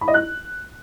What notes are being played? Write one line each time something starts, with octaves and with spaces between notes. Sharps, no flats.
B5
D#5
F#6